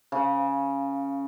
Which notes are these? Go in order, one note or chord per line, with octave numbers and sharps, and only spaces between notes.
C#3